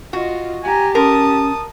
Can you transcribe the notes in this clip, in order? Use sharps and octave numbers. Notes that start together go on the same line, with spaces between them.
F4 F#4 D#5
G4 G#5 A#5
C#4 A#4 A5 D#6